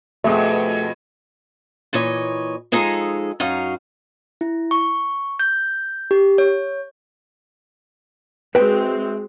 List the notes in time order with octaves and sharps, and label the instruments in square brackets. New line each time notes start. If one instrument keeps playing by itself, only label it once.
[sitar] F2 B2 [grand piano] A3 G#4
[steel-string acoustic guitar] A#2 E3 C#5 D#5
F3 G#3 D#4 G#4 A4 A#5
F#2 D#4 F#4 F5
[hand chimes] E4
C#6
G6
G4
C#5
[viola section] G#3 C4 F#4 [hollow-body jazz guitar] B4 E5 G5